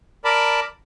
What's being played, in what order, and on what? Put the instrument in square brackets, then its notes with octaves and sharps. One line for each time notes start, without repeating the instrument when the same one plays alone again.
[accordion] A#4 D5 A5 B5